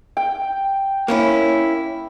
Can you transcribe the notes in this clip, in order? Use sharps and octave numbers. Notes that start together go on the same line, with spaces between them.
G5
A#3 C#4 E4